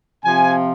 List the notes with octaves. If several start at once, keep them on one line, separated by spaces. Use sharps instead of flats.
C3 F3 C4 F4 G#5